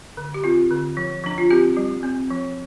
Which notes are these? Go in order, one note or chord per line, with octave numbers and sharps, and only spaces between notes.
D3
G4
C4 F4
D3
F3
F3 D4
F4
C4 G4
G3
C4
F3